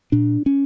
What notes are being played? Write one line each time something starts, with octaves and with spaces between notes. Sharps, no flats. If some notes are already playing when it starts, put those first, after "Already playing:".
A#2 D4
C#4